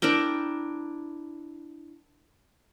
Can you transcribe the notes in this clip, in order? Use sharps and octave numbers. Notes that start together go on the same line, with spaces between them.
D4 E4 A#4 G5